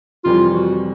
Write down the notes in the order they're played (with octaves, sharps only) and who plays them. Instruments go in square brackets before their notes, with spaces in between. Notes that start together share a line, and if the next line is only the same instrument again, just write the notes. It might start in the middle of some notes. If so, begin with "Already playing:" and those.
[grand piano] F2 C3 E3 G3 [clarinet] F4
[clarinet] F#4